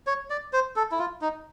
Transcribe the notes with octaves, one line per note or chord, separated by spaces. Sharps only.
C#5
D5
C5
A4
E4
F4
D#4